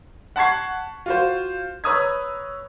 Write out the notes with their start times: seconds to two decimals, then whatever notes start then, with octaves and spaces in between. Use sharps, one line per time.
0.36 F#5 A5 C#6 G#6 C7
1.06 F4 F#4 C5
1.84 B4 C#5 A#5 D#6 E6 G#6